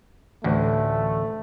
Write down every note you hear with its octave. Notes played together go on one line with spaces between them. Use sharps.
A1 D2 A3